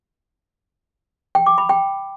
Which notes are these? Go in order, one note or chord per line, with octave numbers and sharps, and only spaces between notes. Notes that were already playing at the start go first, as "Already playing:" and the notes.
G5
D6
B5
G5